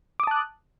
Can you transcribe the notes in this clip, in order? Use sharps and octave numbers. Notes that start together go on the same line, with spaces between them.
A5 D6 D#6 F#6